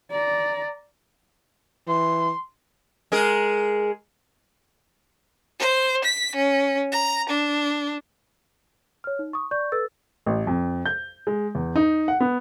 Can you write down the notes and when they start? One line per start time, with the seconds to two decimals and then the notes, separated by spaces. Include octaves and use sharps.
0.12 D5 A#5
1.87 E3 C6
3.12 G#3 G#4 A#4
5.59 C5
6.04 B6
6.35 C#4
6.92 A#5
7.29 D4
9.04 C#5 F6
9.19 D#4
9.33 C#6 D#6
9.51 D5 C#6 G6
9.72 A4 B4 E6 A6
10.26 A1
10.47 F2
10.86 G6
11.27 G#3
11.55 E2
11.76 D#4
12.08 F#5
12.20 B3